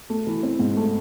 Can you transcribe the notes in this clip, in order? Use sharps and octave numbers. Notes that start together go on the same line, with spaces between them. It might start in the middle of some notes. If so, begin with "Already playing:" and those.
A3
E3
C4
G#2
A3